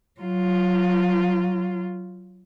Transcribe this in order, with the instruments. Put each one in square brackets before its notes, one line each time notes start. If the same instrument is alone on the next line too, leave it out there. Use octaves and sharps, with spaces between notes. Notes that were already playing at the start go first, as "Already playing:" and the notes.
[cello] F#3 F4